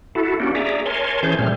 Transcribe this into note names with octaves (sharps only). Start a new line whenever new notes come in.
E4 F#4 A4
A#3 C#4 D4 F#4 G4
G#4 D5 E5 A#5
A#4 C#5 G#5 A5 C6
E3 C#4 G#4 C5 A5 G6
A#2 G3 A3 C4 F6